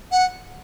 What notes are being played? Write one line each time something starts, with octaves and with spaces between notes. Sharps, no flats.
F#5